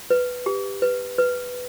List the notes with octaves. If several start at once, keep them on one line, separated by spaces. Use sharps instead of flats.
B4
G4
B4
B4